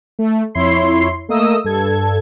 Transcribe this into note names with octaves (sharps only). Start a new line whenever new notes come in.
A3
F2 E4 C#5 C6 C7
A3 A#3 D#5 D#6 E6
G2 A4 G#6